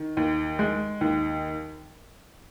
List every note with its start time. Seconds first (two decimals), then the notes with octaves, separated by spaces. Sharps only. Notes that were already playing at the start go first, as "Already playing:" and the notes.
Already playing: D#3
0.17 D#2
0.59 G#3
1.01 D#2